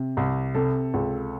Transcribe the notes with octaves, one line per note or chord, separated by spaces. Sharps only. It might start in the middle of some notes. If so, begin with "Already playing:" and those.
Already playing: C3
C2
C3 A4
C#2